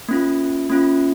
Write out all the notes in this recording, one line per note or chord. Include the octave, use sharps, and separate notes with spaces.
A#3 C#4 F4
A#3 C#4 F4